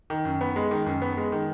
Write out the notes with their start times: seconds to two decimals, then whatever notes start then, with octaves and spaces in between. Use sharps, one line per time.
0.10 D#3
0.25 F#2
0.41 B3
0.56 G#3
0.71 D#3
0.86 F#2
1.02 B3
1.17 G#3
1.32 D#3